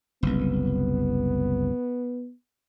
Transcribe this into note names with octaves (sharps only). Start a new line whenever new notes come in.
F#1 C2 B3